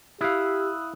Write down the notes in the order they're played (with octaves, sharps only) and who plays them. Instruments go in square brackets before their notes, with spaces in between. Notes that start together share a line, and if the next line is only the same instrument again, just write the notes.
[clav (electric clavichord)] E4 F5 [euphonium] G4 [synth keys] D#6 E6 F#6